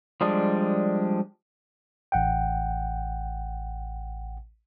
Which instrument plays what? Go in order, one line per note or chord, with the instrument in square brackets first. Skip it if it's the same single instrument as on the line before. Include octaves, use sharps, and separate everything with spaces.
[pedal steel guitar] F3 G3 G#3 D4
[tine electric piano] A1 F#5 G5